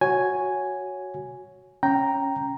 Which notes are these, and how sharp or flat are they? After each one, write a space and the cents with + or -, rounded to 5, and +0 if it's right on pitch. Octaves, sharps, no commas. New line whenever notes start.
F#4 +0 C#5 +0 G#5 +0
C#4 +0 G5 +0 A#5 +0